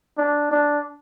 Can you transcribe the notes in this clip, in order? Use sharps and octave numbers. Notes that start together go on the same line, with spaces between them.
D4
D4